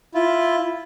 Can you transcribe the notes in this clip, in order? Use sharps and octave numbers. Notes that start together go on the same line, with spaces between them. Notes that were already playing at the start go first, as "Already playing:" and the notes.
E4 F4